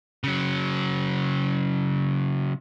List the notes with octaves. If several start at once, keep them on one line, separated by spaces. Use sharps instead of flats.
C#3 F#3